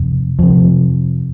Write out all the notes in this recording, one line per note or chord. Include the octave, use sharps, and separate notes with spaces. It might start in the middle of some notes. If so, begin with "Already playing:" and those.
Already playing: F2 C3
F2 C3 F3